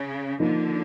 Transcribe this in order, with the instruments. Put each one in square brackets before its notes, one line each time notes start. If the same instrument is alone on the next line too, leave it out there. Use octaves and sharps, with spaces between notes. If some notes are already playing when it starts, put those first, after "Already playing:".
Already playing: [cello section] C#3
[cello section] D3 [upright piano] F3 A#3 D#4